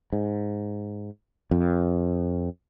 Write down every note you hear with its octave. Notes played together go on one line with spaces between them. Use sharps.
G#2
F2